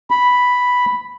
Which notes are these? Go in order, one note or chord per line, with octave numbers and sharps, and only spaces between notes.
B5